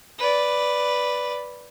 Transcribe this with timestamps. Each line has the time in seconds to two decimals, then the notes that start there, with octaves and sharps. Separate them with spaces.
0.19 B4 D5